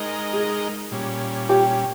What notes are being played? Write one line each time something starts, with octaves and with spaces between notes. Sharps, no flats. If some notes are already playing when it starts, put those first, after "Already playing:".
Already playing: G#3 D#4 A#4 D#5
G#4
A#2 G3 C#4
G4